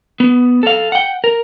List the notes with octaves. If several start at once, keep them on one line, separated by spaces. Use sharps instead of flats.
B3
A4 F5
F#5 G5
A#4